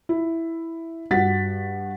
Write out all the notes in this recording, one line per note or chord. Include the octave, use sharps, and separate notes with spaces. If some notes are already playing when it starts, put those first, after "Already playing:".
E4
G2 F#4 F#5 A6 B6